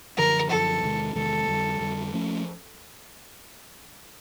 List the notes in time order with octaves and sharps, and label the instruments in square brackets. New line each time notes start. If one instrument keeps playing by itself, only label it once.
[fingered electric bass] F#2 D3 F3 [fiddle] A#4
[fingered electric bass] F#2 D3 F3 [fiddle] A4
[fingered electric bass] E2 C3 D#3 G#3
[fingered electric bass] E2 C3 D#3 G#3 [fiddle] A4
[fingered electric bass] F2 D3 G3
F2 D3 G3
F3 A3 C#4